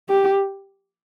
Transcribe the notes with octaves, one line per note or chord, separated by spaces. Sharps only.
G4